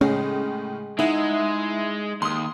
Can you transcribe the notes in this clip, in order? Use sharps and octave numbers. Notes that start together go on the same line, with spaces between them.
A2 C#3 G#3 C#4
G#3 D#4 E4 F#5
D#2 C6 D#6